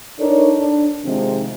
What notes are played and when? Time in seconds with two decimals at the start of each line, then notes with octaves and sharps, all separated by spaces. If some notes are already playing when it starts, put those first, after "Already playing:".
0.19 D4 D#4 A4 A#4 C#5
0.57 D4
1.05 C3 D#3 F3 G#3 C4 D#4